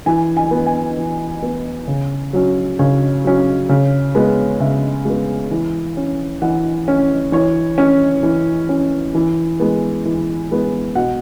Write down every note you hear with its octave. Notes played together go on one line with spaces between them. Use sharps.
E3 G#5
G#5
B3
G#5
E3
B3
C#3
F#3 C#4
C#3 C#5
F#3 C#4
C#3
G#3 B3
C#3 E5
G#3 B3
E3
C#4
E3 F#5
C#4
E3 C#5
C#4
E3
C#4
E3
G#3 B3
E3
G#3 B3
B2 F#5